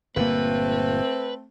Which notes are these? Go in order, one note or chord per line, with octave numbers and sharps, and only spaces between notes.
G1 A#2 A3 A#3 C4 B4